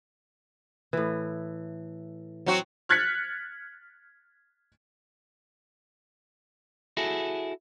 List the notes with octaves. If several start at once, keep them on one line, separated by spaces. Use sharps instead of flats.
A2 E3
F#3 C4 F#4
F6 F#6 G#6 A6 B6 C#7
E4 F#4 G#4 A4